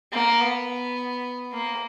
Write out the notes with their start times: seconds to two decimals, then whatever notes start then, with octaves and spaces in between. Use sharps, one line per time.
0.13 A#3
0.40 B3
1.53 A#3